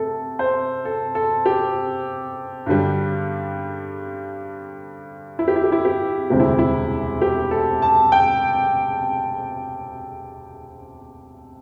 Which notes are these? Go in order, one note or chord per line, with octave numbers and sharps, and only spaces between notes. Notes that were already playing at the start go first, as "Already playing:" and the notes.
Already playing: C3 A3 A4
C5
A4
A4
G4
G2 D3 G3
E4
G4
E4
G4
E4
G4
E1 D2 C3 G3 C4 G4
E4
E4
G4
A4
A5
G5